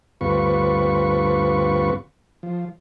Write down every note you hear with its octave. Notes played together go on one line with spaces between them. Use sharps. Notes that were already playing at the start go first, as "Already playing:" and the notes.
D2 G2 C4 F4 B4 C#6
F3